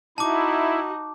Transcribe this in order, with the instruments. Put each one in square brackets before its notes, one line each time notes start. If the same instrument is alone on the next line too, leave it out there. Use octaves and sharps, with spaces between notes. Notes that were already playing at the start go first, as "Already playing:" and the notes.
[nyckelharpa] D#4 F#4 [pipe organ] E4 [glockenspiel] A5 D6